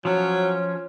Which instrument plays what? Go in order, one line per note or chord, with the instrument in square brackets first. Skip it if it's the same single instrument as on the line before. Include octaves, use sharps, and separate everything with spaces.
[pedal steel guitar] F3 C#4 [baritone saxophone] F#3